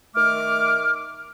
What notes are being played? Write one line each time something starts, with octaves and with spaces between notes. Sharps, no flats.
D#3 A3 D6 F6